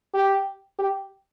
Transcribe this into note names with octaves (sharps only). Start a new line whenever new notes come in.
G4
G4